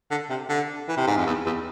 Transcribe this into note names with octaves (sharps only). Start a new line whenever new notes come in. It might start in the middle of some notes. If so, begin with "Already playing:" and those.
D3
C3
D3
E3
C3
G#2
F2
E2
E2